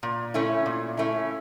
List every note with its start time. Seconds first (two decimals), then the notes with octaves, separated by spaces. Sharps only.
0.03 A#2
0.34 A3 C#4 E4
0.66 A#2
0.97 A3 C#4 E4